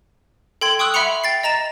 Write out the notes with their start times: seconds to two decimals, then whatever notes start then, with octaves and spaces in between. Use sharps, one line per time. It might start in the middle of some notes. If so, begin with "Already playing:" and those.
0.61 A4 G5 C6 G#6 G7
0.79 G5 C#6 D#6 E6 F#6
0.94 E5 F#5 B5 C6 C#7 F7
1.24 G5 A6 C7
1.44 D#5 A#5 A6 E7